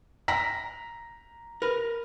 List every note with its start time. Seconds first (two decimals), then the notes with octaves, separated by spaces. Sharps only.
0.28 A#5 A#6 B6
1.62 A#4 B4